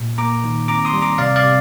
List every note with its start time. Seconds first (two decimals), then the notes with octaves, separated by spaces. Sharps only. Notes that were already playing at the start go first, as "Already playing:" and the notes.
Already playing: A#2
0.18 A#3 A#5 D6
0.44 D#3
0.68 C4 A#5 D6
0.85 C6 D#6
0.93 G3
1.02 A#5 D6
1.18 C3 D5 F5
1.36 D5 F5
1.44 C3